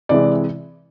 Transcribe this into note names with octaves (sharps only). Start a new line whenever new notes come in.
C3 E3 G#3 D5